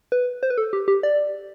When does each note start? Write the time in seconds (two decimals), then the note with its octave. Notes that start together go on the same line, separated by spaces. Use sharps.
0.12 B4
0.43 C5
0.50 B4
0.58 A4
0.73 G4
0.88 G4
1.03 D5